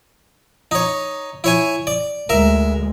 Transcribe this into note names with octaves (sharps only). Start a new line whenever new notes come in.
D#4 C#5
E4 C#5 G#5
D5
D2 G#3 A#4 E5